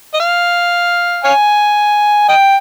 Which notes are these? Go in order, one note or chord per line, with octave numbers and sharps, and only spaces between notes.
D#5
F5
C#5 F5 G#5
D#5 G5